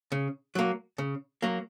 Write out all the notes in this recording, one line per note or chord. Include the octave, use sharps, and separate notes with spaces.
C#3
F#3 A#3
C#3
F#3 A#3